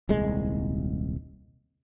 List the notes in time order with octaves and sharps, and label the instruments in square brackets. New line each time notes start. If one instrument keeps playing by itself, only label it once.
[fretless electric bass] D#1 C2 G#3